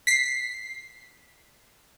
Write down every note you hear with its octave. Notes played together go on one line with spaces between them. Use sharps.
B6 C7